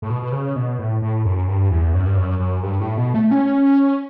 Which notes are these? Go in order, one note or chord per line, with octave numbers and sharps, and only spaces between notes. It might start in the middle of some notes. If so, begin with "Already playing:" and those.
A2
B2
B2
C#3
B2
A2
A2
F#2
G2
E2
F#2
G2
F#2
F#2
G2
A2
B2
A3
C#4